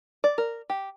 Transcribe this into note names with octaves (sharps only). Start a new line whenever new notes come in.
D5
A#4
G4